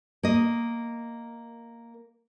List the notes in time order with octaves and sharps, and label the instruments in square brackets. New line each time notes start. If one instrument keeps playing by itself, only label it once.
[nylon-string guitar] A#3 D#5